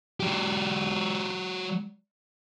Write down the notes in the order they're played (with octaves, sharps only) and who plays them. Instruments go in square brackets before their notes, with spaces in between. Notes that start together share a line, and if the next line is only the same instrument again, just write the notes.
[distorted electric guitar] F#3 G4